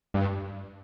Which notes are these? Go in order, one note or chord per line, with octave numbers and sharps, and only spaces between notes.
G2